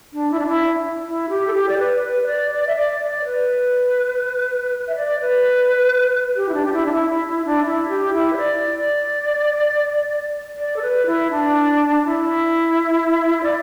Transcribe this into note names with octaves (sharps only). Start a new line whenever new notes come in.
D4
E4
D4
E4
E4
G4
A4
G4
D5
B4
B4
B4
D5
D5
E5
D5
D5
D5
B4
E5
D5
B4
G4
E4
D4
G4
E4
D4
E4
E4
E4
D4
E4
G4
E4
B4
D5
D5
A4
B4
E4
D4
E4
D5